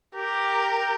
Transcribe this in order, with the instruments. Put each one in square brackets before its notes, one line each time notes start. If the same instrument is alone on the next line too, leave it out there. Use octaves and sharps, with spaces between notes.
[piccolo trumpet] G4 [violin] A#4